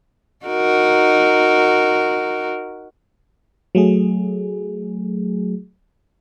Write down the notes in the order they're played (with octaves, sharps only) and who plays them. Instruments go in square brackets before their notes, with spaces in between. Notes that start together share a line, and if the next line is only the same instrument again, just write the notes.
[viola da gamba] D#4 F#4 A#4
[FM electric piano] F#3 A3 G#4